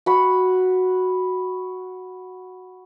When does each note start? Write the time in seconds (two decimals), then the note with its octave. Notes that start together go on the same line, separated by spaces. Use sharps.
0.06 F#4 B5